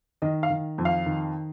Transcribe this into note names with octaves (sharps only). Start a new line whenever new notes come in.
D#3 D#5
F5
D#3
F2
F5
D#3